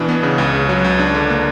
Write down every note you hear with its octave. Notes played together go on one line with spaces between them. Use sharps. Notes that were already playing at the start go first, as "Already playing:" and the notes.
Already playing: B2 E3 D4
B3
C#3
C#2
C#3
F#3
C#2
D4
D3
A#3